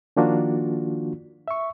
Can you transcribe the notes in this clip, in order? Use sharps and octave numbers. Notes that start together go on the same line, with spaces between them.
D#3 F3 A#3 D4 F4 F#4
E5 C#6